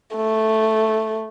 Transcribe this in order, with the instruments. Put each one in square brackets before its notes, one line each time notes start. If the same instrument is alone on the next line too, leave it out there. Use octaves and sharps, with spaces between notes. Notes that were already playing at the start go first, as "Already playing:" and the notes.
[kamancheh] A3